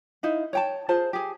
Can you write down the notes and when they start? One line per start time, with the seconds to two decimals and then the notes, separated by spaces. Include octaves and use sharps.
0.23 D#4 E4 F5
0.53 C#5 G5 A5
0.88 F4 G#4 C5 A5
1.13 G4 G#4